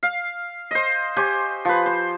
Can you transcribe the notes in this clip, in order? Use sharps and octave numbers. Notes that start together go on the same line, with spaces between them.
F5
C5 D#5
G4 C5 G#5 C#6
F3 B4
C5